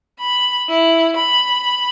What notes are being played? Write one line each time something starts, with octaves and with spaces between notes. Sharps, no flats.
B5
E4
B5